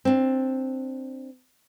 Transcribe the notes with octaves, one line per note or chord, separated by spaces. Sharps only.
C4 D4